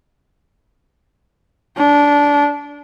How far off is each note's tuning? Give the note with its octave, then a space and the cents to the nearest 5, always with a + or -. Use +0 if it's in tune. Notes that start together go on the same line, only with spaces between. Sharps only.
D4 -20